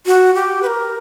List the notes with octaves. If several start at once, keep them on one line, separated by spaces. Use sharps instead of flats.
F#4
G4
B4
A#4